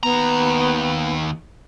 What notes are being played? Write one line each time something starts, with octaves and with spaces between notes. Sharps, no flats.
D#2 B3 A#5